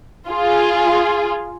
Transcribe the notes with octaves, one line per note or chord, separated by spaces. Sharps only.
F4 G#4